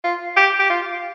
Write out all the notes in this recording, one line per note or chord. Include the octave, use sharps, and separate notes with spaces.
F4
G4
G4
F4